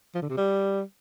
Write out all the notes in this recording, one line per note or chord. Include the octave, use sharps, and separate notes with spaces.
F3
D3
C3
G3